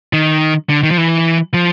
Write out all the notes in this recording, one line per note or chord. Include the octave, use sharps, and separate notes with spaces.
D#3
D3
D#3
F3
E3
F3